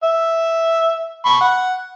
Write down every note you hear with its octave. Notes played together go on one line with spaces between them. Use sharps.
E5
B5 C#6
F#5